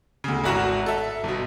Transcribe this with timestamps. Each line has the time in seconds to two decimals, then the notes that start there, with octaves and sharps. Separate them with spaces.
0.24 D2 C#3
0.44 G#1 E4 F#4 F#5 A#5 E7
0.86 A4 E5
1.24 G1 B2